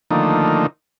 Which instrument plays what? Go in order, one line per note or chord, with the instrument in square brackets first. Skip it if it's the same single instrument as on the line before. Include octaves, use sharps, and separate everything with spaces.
[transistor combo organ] D3 D#3 F3 A3 A#3 D#4